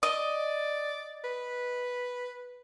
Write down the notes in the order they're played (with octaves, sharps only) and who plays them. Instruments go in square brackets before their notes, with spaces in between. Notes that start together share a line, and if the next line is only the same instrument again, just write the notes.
[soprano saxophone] D5 [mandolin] D#5
[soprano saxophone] B4